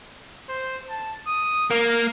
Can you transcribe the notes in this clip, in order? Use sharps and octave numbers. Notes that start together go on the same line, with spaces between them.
C5
A5
D#6
A#3 A#4